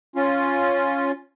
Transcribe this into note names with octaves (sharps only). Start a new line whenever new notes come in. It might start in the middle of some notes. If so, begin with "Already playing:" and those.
C#4 F4